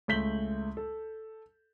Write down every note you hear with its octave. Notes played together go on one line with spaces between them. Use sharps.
C#2 A3 G6 B6 F#7 G7
A4